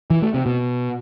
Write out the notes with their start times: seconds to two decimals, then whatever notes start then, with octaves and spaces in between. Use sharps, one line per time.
0.10 E3
0.22 A3
0.34 C3
0.46 B2